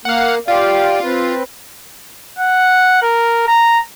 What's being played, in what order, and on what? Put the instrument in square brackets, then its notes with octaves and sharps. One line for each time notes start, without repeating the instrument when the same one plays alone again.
[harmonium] A#3 [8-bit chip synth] F5 F#5
[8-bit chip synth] F4 [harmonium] G4 D5 F5
[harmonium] C4 B4
[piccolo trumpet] F#5
A#4
A#5